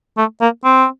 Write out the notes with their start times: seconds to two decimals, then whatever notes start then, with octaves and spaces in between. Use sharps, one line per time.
0.17 A3
0.41 A#3
0.64 C4